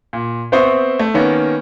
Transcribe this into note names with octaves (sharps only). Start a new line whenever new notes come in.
A#2
B3 C4 C5 E5 C#6 D#6
A3
D#3 A#3 B3 C#4